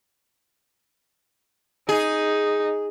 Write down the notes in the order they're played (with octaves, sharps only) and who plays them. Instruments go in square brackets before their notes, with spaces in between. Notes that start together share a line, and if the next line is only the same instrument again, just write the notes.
[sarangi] D#4 [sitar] G#4